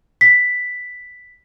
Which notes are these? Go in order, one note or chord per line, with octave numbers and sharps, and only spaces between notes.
B6